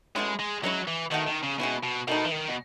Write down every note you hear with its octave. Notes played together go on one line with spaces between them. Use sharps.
B2 G#3 A3 C#4 E4
G#3
F#3 G#3 C#4 E4
E3
B2 D#3 A3 D#4 F#4
D#3
C#3
B2 G#3 C#4 E4
B2
B2 D#3 A3 D#4
E3
D#3
B2